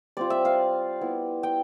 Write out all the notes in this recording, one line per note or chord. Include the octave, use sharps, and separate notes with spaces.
G3 C4 F4 D5
E5
F5
B3 E4
G5